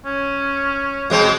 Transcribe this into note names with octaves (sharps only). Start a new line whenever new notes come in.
C#4
B2 G#3 C4